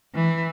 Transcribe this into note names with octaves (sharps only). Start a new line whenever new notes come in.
E3